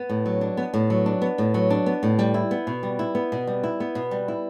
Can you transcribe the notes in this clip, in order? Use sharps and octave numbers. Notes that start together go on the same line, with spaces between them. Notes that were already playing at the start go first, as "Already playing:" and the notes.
Already playing: B3
A2
F#3
D4
B3
A2
F#3
D4
B3
A2
F#3
D4
B3
A2
G3
E4
B3
B2
G3
E4
B3
B2
G3
E4
B3
B2
G3
E4